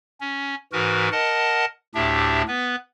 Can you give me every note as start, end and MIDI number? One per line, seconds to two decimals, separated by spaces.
0.21 0.55 61
0.73 1.09 44
0.73 1.09 52
0.73 1.09 66
0.73 1.09 70
0.73 1.09 71
1.12 1.65 70
1.12 1.65 75
1.12 1.65 78
1.12 1.65 81
1.95 2.42 38
1.95 2.42 45
1.95 2.42 62
1.95 2.42 67
1.95 2.42 76
2.48 2.76 59
2.48 2.76 71